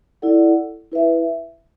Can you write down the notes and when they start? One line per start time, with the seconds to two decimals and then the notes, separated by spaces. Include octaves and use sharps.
0.22 E4 A4 D5 F#5
0.92 E4 B4 E5